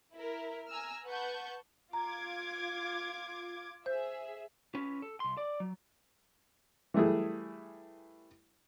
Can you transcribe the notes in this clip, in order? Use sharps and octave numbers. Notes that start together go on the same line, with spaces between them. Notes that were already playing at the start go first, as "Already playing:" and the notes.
E4 A#4
G#5 A#5 E6 F6
B4 F#5 A5 C#6 G6
F4 A#5 D6 G#6
G#4 C5 E5 G6
C#4 B4
A4
C2 C6
D5
F#3
E3 G3 A3 E4 G#4